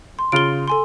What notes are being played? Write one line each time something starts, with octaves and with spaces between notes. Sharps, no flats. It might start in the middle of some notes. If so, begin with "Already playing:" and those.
C6
C#3 F4 F6 D7 G7
A4 G#5 C6